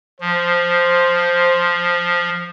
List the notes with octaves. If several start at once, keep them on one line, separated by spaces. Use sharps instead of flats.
F3 C5